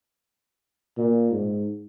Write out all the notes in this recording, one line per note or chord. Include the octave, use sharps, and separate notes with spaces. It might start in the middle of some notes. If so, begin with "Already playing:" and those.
A#2
G#2